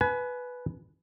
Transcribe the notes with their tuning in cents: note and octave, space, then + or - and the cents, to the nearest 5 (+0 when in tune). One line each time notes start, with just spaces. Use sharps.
B4 +0 G#5 +35